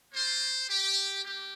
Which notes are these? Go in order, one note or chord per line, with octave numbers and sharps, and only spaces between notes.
A#3 F4 C5
G4
A#3 G4